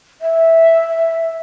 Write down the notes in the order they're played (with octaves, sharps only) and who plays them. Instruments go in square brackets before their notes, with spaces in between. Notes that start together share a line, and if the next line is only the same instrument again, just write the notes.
[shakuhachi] E5